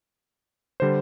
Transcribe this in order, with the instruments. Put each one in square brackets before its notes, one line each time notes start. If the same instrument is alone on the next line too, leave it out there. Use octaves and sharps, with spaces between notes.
[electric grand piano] D3 G3 C5